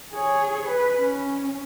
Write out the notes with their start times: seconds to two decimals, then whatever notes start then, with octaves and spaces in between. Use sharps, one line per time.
0.12 G#4 C#5
0.66 B4
0.99 C#4